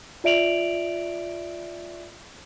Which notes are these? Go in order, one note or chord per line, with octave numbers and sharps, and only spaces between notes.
F4 D5 E5 D7 F7 F#7